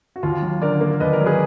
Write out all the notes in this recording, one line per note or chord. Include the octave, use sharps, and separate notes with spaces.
F#4
D#2 F4
F#3
D3 A#4 D5
A#3
D#2 B4 D#5
A#4 D5
F#3
G#4 B4